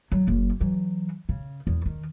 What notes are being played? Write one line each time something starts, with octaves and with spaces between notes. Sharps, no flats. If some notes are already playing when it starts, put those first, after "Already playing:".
F#3
F#1
E3 F#3
C#3
E2
D#3